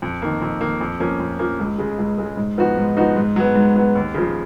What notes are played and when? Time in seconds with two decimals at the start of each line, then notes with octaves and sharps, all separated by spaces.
0.02 F2
0.22 D#3 A#3
0.42 F2
0.61 D#3 A#3
0.81 F2
1.00 F3 A#3 C#4
1.20 F2
1.39 F3 A#3 C#4
1.59 C#2
1.78 C#3 G#3
1.98 C#2
2.18 C#3 G#3
2.37 G#2
2.58 F3 B3 D#4 F#4
2.77 G#2
2.97 F3 B3 D#4 F#4
3.16 G#2
3.36 F#3 B3
3.55 G#2
3.76 F#3 B3
3.95 D#2
4.14 C#3 F3